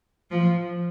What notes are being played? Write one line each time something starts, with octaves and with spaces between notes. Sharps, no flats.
F3